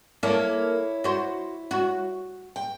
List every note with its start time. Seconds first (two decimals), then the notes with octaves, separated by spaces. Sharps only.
0.23 A#3 E4 A4 C#5
1.04 F#4 C5
1.71 F#4
2.56 G5